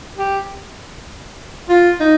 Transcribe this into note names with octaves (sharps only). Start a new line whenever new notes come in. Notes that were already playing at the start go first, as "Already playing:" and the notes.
G4
F4
D#4